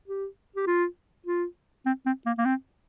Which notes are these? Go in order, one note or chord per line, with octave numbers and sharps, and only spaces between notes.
G4
G4
F4
F4
C4
C4
A#3
A#3
C4